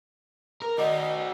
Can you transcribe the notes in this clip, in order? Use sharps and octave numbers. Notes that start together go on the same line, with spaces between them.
A#4
F#4 D5 D#5